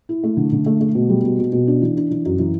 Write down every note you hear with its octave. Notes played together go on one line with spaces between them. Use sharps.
E4
A3
D3
D3
A3
A3
B2
G3
B2
B2
B2
D4
E3
D4
E3
F#2
E3